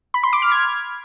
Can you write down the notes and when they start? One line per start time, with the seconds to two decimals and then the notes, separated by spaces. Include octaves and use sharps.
0.14 B5
0.23 C6
0.33 D6
0.42 F6
0.51 G#6